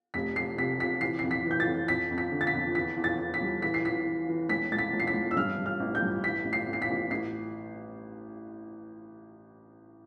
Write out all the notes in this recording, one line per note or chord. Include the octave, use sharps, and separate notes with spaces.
F1 B6
F1 C7
C3 B6
C3 B6
E3 C7
F2 C7
B6
E3
G6
A6
F2
F2 B6
F2
B6
D3
A6
B6
F2
E2 B6
E2
A6
E2
B6
G3
E3 B6
C7
E3 B6
E3
E3
E1 B6
E1 A6
B6
E1
C7
B6
E1
E6
G2 F6
G2
F6
A1
G6
G2
A1 B6
A1
C7
A1
C7
B6
A1
A1 C7